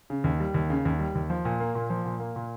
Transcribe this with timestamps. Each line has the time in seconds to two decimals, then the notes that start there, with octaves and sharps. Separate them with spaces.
0.10 C#3
0.24 D#2
0.40 G3
0.54 D#2
0.70 C#3
0.85 D#2
0.99 G3
1.15 D#2
1.30 F3
1.45 A#2
1.60 A#3
1.75 A#2
1.90 F3
2.05 A#2
2.20 A#3
2.36 A#2